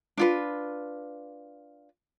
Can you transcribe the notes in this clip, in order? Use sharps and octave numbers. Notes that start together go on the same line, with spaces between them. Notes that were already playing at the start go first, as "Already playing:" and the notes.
D4 F4 B4